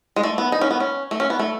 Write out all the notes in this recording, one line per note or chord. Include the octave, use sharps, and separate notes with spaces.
G#3
A3
B3
D#4
C#4
B3
C#4
A3
C#4
B3
A3